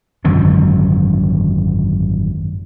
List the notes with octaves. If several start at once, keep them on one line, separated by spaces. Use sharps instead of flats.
G#1 F#2 D3 F3